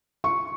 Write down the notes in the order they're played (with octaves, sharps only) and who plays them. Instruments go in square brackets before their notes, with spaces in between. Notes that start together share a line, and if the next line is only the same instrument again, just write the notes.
[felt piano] C#6